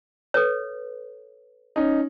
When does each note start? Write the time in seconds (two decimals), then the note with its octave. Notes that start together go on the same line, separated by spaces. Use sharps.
0.34 A4 B4 C#5
1.76 C#4 D#4